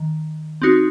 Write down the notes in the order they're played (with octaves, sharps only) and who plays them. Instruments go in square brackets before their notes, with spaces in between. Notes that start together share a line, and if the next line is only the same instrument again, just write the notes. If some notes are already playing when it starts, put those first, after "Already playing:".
Already playing: [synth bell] D#3
C4 D#4 F#4